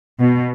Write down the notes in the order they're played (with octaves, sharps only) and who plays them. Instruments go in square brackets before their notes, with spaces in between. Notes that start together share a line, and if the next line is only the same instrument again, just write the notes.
[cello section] B2